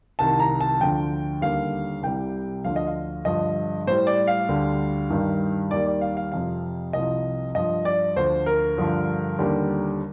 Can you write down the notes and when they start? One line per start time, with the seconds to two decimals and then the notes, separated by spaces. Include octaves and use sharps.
0.19 C2 C3 D#3 A5
0.40 A#5
0.61 A5
0.80 D2 D3 F3 G5
1.41 D#2 D3 G3 F5
2.02 C2 C3 G3 G5
2.64 D2 D3 F3 F5
2.76 D#5
2.87 F5
3.25 G2 D3 F3 D#5
3.87 A2 G3 C5
4.07 D5
4.27 F5
4.49 D2 D3 G3
5.10 G2 D#3 G3
5.71 D#2 D#3 G3 D5
5.86 D5
6.01 F5
6.17 F5
6.32 F2 C3 F3 F5
6.93 C2 C3 F3 D#5
7.55 G2 F3 D#5
7.85 D5
8.16 D2 D3 F3 C5
8.46 A#4
8.78 G2 D3 F3
9.39 D#2 D3 G3